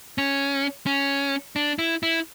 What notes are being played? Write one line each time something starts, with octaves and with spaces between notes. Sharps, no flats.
C#4
C#4
D4
E4
E4